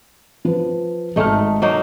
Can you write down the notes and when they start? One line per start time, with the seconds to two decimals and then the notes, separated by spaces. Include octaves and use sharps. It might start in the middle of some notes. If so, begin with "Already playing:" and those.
0.45 F3 B4
1.16 G#1 A3 D#4 A5 F6
1.62 F#3 A#3 D#4